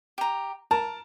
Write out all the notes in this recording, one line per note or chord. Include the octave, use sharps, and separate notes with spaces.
G4 A#5
A#4 A5